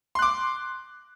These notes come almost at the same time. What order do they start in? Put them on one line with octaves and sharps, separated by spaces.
C6 F#6 D6